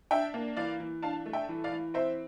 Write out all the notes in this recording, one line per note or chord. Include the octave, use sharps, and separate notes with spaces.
D4 E5 G5
A#3
E3 D5 F5
E3
D4 F5 A5
A3
E5 G5
E3
D5 F5
E3
C4 C5 E5